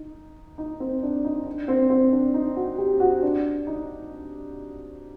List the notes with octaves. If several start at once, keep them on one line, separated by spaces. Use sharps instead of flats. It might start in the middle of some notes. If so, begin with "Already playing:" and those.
Already playing: D#4
D#4
C4
D4
D#4
D4
C4
C4
D4
D#4
F#4
G4
F#4
D4
D#4